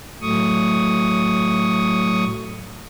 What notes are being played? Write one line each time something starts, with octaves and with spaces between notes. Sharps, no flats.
A2 F#3 A3 C#6 D#6